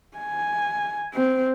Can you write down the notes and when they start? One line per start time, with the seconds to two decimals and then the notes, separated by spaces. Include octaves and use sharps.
0.17 G#5
1.14 C4